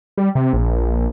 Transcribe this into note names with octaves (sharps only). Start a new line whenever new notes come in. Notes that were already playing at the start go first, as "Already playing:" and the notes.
G3
C3
A#1